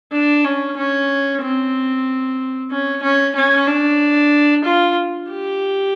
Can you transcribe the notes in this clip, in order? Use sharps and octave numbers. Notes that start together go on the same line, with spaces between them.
D4
C#4
C#4
C4
C#4
C#4
C#4
D4
F4
G4